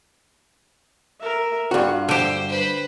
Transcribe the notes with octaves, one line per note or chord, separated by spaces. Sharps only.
A#4 E5
G2 F4 F#4
D3 G4 C5 G5
B4 C5